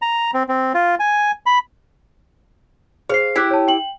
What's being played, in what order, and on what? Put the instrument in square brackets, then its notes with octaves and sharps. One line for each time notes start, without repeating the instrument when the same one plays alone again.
[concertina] A#5
C4
C4
F4
G#5
B5
[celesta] G#4 C5 C7 [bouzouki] F5
[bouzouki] E4 G4 [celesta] D6 F#6 B6
[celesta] C#5 A5
G5 F#7